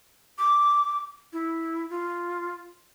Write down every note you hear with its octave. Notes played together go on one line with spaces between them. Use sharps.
D6
E4
F4